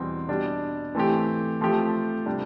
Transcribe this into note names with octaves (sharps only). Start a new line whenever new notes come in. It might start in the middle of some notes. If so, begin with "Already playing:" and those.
Already playing: E2 B2 G3 C4
B2 G3 D4
E3 A3 C4 G4
F3 A3 C4 G4
C3 G3 D4